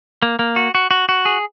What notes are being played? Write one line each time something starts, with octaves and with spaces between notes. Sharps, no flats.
A#3
A#3
F#4
F#4
F#4
F#4
G#4